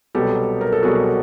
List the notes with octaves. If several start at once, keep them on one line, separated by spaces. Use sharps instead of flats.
C2 B2 F#3 B3 G4 A4
A#4
A4
C2 B2 F#3 B3 F#4 G#4